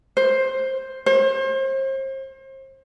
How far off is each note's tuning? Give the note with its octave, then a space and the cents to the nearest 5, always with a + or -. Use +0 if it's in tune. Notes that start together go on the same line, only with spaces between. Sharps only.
C5 +10
C5 +35